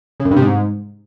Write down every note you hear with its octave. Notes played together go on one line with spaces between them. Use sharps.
C#3
F#2
G2
C3
G#2